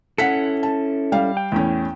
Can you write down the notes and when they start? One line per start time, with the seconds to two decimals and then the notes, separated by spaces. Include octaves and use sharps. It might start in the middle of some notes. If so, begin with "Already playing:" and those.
0.18 C#4 E4 A4 F#5 B6 C#7
0.63 A5
1.12 G3 F5
1.37 G5
1.52 E2 A2 C#4